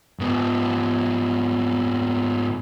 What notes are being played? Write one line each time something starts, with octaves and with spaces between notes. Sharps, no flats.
G#2 B3